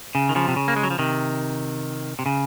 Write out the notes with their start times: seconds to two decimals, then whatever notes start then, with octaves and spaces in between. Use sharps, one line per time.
0.15 C#3
0.29 D#3
0.35 C#3 F3
0.48 C3
0.56 C#3
0.68 A#3
0.76 G#3
0.83 F#3
0.90 F3
0.99 C3 D#3
2.19 C3
2.26 C#3